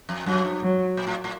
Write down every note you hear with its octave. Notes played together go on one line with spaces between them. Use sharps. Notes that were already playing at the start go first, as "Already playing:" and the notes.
F2
F#2 F#3
G2
F#3
A#2
A2
A2